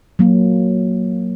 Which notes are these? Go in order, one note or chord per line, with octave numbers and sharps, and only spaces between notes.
F#3 A#3